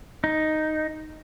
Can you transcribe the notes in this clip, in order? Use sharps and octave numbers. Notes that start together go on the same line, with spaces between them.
D#4